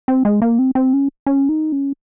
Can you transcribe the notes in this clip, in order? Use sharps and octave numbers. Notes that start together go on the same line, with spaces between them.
C4
G#3
A#3
C4
C4
C#4
C#4
D#4
C#4